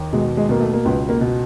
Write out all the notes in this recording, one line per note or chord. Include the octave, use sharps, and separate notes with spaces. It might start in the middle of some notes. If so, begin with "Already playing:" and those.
Already playing: D#2 D#3
B2 G#3
G#3
B2 A#3
A3
A#3
C#2 B3
A#3
B2